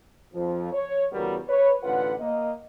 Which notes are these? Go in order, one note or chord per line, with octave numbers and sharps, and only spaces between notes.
F2 F3
C#5
E2 C#3 G3 B3 F#4 A#4
B4 C#5
A1 D3 F4 B4 F#5
A#3 D#5